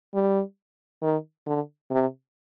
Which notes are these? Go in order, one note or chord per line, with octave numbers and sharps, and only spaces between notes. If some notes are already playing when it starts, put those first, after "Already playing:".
G3
D#3
D3
C3